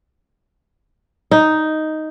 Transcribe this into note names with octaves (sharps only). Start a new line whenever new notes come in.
D#4